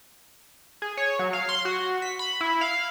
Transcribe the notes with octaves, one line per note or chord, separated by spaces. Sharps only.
G#4
C#5
F#3
F5
C6
F#4
B6
B5
E4
F5